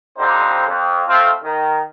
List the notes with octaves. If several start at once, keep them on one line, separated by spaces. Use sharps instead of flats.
F2 D3 G3 C4 D#4 C5
F2
A3 C4 F4
D#3